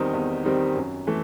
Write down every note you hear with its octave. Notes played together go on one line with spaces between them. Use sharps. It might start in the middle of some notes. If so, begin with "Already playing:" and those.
Already playing: E2 D#3 G3 C4 D#4
E2
D#3 G3 C4 D#4
F#2
E3 A3